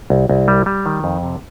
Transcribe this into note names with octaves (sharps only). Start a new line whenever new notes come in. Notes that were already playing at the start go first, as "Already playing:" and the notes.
C2
C2
G3
G3
D#3
F2
C3